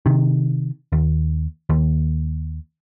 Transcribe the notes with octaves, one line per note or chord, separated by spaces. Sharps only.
C3 D#3
D#2
D#2